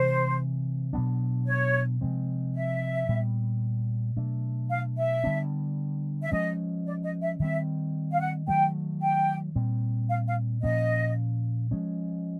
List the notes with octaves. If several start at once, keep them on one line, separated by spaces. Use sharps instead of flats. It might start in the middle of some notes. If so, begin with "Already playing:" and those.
Already playing: C3 E3 G#3 C5
B2 F#3 B3 D4
C#5
C3 F3 G#3 C4
E5
A#2 G3 B3
B2 F#3 A3 D4
F5
E5
D3 G3 B3 D4
E5
F3 G#3 C#4 D#5
D5
D#5
E5
D#3 G3 C4 E5
F5
F#5
D#3 F#3 A3 G5
G5
A#2 G3 C4
F5
F5
A#2 F3 A#3 C#4 D#5
F3 G#3 C#4